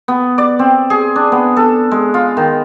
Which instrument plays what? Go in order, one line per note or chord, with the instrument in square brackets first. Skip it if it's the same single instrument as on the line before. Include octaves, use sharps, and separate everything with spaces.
[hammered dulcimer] B3
D5
C4
G#4
D4
B3
A4
G#3
F4
D#3